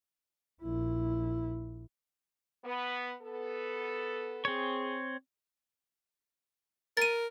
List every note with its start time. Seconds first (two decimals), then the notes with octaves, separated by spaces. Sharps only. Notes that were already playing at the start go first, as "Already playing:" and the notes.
0.62 A#1 E4
2.64 B3
3.22 B3 A4
4.45 C4 G#4 C#5
6.97 A#4 A6 D#7